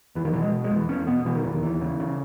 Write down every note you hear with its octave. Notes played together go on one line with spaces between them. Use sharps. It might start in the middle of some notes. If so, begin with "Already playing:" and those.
E2 E3
D#3
B2 E3
G#3
B2
G#3
E2
E3
E2 C#4
B2 B3
B2 E3
D#3
E2 E3
D#3
D#2 E3
C#3
C#3